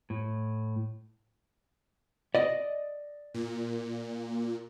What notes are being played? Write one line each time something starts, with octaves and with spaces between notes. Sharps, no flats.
A2
D5 D#5
A#2